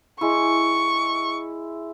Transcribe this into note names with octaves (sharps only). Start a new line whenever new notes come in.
G#3 E4 C#6